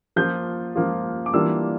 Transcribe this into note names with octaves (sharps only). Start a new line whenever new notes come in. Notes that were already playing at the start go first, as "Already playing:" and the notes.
F3 A#3 F4 G6
F3 A#3 F4
D6
E3 G3 A#3 D4 F4 E6